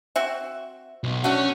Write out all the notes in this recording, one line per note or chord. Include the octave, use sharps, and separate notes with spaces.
C4 F#4 E5
B1
A3 C#4 D4 F#4